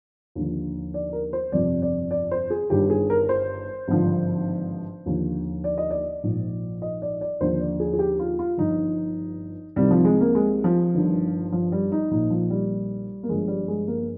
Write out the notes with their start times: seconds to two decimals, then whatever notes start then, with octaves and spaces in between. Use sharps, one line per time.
0.35 D#2 D3 F3
0.94 D5
1.13 A#4
1.33 C5
1.52 G1 F2 C3 F3 D5
1.82 D5
2.11 D5
2.31 C5
2.50 G#4
2.70 G1 G2 D#3 G4
2.90 G#4
3.10 A#4
3.29 C5
3.88 G#1 G2 D3 F3
5.06 D#2 D3 F3
5.64 D5
5.78 D#5
5.90 D5
6.24 A#1 G#2 F3
6.82 D#5
7.02 D5
7.21 D5
7.41 D#2 D3 F3 C5
7.60 D5
7.80 G#4
7.93 G#4
7.99 G4
8.19 F4
8.39 F4
8.58 G1 G2 F3 D#4
9.76 C2 C3 D#3 G3
9.91 F3
10.05 G#3
10.20 A#3
10.35 G#3
10.64 F3
10.94 G1 G2 D#3
11.52 F3
11.72 G3
11.92 D#4
12.11 A#1 A#2 F3 D#4
12.30 F3
12.50 G3
13.23 A#3
13.28 G1 G2 F3 G#3
13.48 G3
13.68 G#3
13.87 A#3